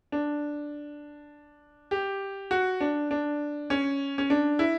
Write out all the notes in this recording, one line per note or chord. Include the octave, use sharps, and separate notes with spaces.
D4
G4
F#4
D4
D4
C#4
C#4
D4
E4